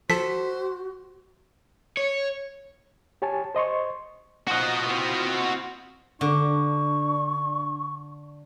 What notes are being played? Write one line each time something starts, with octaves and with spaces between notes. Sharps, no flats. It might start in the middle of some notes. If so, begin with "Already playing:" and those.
F3 F#4 A4 C5 B6
C#5
G4 C#5 G#5 A5
C5 D#5 C6 C#6
F3 D#4 F#4 D#5 F#5
C4 E4 F4
D3 D4 C#6